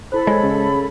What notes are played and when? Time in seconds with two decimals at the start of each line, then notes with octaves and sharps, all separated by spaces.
0.12 E4 A4 C5 B5
0.27 G#3 C#5 G#6
0.43 C#3